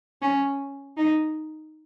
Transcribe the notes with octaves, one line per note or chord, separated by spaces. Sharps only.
C#4
D#4